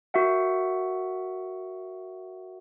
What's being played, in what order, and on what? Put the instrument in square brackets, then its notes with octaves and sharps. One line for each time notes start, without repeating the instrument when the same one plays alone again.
[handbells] F#4 A#4 E5 F#5